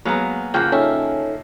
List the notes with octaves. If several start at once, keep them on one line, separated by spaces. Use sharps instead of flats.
F#3 G#3 A#3 B3 F5 A#5
C#3 F3 A#3 F#5 G5 F6
C#4 D#4 A4 E5